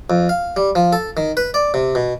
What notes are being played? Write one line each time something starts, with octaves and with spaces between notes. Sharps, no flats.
F2
F5
G3
F3
A4
D#3
B4
D5
C3
B2